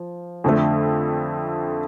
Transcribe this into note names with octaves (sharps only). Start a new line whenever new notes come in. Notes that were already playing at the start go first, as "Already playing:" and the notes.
Already playing: F3
F2 D3 A3